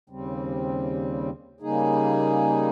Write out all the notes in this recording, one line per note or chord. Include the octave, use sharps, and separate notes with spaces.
D#2 C#3 G3 C4
C#3 G3 A#3 D#4 G#4